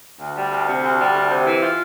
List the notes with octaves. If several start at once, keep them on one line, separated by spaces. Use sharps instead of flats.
D2
G3
D2
C3
D2
G3
D2
C3
E3
F4